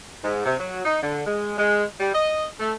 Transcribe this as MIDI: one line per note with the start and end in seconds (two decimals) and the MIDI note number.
0.24 0.42 44
0.45 0.56 48
0.59 0.83 54
0.85 1.00 63
1.02 1.24 50
1.26 1.57 56
1.58 1.84 56
2.00 2.13 55
2.14 2.45 75
2.60 2.73 57